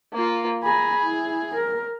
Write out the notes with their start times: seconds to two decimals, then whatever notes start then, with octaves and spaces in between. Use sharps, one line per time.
0.12 A#3 F4
0.63 G#4 A#5 B5
1.03 E4
1.55 A#4